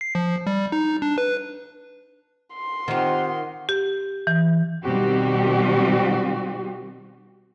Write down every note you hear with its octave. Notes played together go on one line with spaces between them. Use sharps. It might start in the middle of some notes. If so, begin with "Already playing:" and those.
C7
F3
G3
D#4
D4
B4
C6
D#3 C4 F4 G4 C5 F#5
G4
E3
B2 D#3 G3 C4 F#4 G4